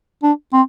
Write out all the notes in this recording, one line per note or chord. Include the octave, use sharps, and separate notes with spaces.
D4
C4